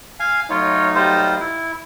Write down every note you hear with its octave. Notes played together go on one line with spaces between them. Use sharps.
F5 G#5
F#3 A3 D#4 F4 C#5
G3 F4 C5
E4